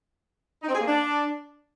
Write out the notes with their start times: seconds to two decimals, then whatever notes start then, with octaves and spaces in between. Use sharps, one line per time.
0.62 D#4
0.69 C4
0.75 G#4
0.81 A#3
0.87 D4